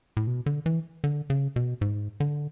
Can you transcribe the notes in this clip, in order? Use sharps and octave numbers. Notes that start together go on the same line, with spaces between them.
A2
B2
D3
E3
D3
C#3
B2
G#2
D3